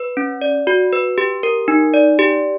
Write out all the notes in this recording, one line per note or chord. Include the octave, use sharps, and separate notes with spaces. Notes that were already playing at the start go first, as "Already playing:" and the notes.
Already playing: B4
C#4
D5
F#4
B4
G4
A#4
D#4
D5
G4